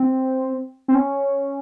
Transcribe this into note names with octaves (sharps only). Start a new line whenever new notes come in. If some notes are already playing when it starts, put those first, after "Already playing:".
Already playing: C4
C4
C#4